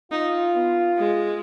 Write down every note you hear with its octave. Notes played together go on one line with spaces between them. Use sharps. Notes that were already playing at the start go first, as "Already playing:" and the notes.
D#4 F4
B3
G#3